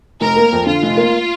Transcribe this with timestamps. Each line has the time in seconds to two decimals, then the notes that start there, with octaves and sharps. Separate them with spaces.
0.21 F1 A#4
0.36 A#3
0.52 F2
0.66 D3 F4
0.82 F1
0.97 A#3